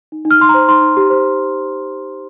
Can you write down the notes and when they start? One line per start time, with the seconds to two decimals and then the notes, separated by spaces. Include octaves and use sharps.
0.12 D#4
0.25 D#4
0.31 F6
0.40 D#4 C6
0.49 A#5
0.54 C5
0.68 D#4 C6
0.82 D#4
0.97 G4
1.10 C5